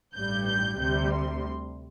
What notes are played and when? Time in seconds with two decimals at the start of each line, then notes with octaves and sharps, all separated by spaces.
0.15 A1 G2 G3 G6
0.47 G6
0.80 D2 C3 G3 G6
1.12 C6